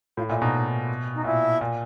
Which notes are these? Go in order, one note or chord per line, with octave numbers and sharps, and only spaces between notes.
A2 F4
A#2 E4
B2 D#4
D#4
A#2 E4
A#2